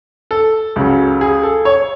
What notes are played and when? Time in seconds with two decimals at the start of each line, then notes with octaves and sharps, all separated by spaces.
0.31 A4
0.76 C#2 C#3 F#3
1.21 G#4
1.43 A4
1.65 C#5